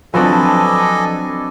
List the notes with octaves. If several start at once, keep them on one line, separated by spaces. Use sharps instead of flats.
F3 F#3 C4 D4 A4 B4 D#5 G#5